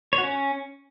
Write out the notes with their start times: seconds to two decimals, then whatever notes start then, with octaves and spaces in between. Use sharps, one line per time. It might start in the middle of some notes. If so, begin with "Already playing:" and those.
0.13 C#5
0.18 F#4
0.23 C#4